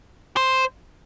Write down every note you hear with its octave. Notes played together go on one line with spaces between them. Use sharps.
C5